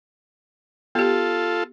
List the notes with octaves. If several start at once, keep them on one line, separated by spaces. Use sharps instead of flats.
B3 F4 G4 A4